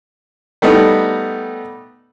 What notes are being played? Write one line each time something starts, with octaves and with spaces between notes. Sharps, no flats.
G3 A3 B3 D#4